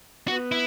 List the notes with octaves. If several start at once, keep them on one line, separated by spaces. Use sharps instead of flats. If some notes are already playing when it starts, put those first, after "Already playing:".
B3 F#4
E4